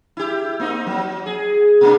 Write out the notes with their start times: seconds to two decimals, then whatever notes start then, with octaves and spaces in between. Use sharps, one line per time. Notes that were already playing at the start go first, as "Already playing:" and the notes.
0.17 E4 G4
0.60 A#3 C4 D#4
0.87 F#3
1.26 G#4
1.81 B2 A#3 D4